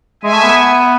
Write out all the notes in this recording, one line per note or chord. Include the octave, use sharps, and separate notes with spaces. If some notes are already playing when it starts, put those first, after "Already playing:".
G#3 E5 G#5
A3
B3